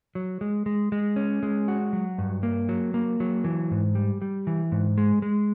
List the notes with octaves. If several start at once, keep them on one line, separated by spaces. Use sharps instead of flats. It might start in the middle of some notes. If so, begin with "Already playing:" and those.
F#3
G#3
G#3
G#3
C#4
G#3
F#4
F#3
G2
A#3
F#3
A#3
F#3
E3
G#2
G3
G3
E3
G#2
G#3
G#3